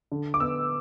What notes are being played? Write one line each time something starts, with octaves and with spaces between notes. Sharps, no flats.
D3
D6
B3 E6